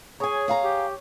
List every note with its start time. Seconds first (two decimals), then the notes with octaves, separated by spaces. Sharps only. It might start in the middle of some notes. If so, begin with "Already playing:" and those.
0.20 G#4 C#5 G#5 A#5
0.48 G#4 F5 A#5
0.62 G4